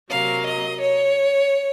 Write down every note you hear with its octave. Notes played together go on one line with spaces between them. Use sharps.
C3 F#3 A#3 F5
D#5
C#5